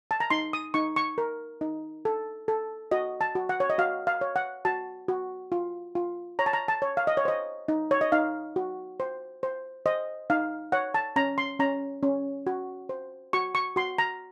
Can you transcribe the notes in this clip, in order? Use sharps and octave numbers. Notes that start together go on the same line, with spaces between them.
A5
A#5
D#4 C6
D#6
D#4 C#6
C#6
A#4
D#4
A4
A4
F#4 D#5
A5
F#4
F#5
C#5
D#5
F#4 F5
F5
C#5
F#5
F#4 A5
F#4
F4
F4
C#5 A#5
A5
A#5
A5
C#5
F5
D#5
C#5
C5 D#5
D#4
C#5
D#5
D#4 F5
F#4
C5
C5
C5 D#5
D#4 F5
C#5 F#5
A5
C#4 A#5
C6
C#4 A#5
C#4
F#4
C5
F#4 C#6
C#6
F#4 C6
A#5